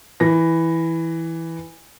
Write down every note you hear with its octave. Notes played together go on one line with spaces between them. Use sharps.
E3 A#6